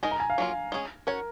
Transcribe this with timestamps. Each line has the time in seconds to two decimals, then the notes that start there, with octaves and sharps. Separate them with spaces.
0.03 G#3 D#4 A#4 D#5 G#5
0.11 A#5
0.20 G#5
0.30 F5
0.38 F#3 A#3 F4
0.72 G#3 C#4 G#4
1.07 C#4 F#4 A#4 C#5